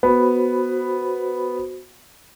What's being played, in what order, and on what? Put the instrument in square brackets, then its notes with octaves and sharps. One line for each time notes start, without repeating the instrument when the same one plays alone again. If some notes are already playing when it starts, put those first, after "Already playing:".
[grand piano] B3 [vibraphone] F#4 C5 B5